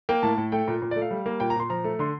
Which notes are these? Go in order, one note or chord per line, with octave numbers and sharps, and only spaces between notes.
A#3 G5
A2 A5
A2
A3 G5
A#2
A#2
D5
A3
F5
G3
A#3
A#2 G5
A#5
A#2 C6
F3 A#5
A3
D3 C6